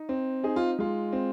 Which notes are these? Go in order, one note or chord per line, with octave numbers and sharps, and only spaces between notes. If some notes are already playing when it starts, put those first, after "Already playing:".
Already playing: D#4
C4
D#4 G#4
F4
G#3 F4
C4